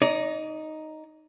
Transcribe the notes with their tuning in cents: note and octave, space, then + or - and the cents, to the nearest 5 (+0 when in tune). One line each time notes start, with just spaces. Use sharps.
D#4 +0 D5 -40